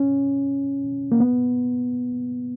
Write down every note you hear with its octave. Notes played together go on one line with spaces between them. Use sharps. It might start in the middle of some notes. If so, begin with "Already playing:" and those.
Already playing: C#4
A#3
B3